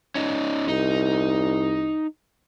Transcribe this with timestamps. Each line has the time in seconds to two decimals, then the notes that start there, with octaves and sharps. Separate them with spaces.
0.15 C#4 D#4
0.68 C2 D#4